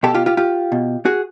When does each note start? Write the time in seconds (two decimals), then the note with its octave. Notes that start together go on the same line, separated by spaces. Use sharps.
0.03 B2 G4 A4
0.14 F4 G4
0.26 F4 G4
0.37 F4 G4
0.72 B2
1.05 F#4 G#4